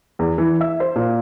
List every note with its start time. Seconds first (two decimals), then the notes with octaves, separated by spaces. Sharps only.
0.19 E2
0.38 E3
0.61 E5
0.80 C5
0.96 A#2